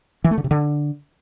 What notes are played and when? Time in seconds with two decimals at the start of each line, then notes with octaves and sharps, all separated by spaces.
0.24 E3
0.31 A3
0.38 D3
0.44 C3
0.51 D3